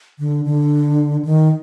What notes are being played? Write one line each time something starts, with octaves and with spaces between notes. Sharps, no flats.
D3
D3
D#3